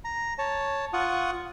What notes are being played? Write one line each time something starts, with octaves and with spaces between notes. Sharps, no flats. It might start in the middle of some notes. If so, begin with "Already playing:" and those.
A#5
C#5 A5
F4 F#5 C#6 D#6